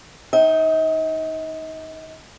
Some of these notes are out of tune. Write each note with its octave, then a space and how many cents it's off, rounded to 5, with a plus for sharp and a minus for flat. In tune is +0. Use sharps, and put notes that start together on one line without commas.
D#4 +0 D#5 +40 G5 -10